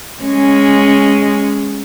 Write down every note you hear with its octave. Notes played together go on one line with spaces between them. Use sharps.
G#3 C#4